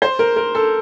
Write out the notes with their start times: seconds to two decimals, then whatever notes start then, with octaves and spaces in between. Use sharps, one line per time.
0.02 C5
0.19 A#4
0.36 A#4
0.55 A4